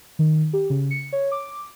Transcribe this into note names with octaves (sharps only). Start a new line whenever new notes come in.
D#3
G4
C#3
C#7
C#5
D6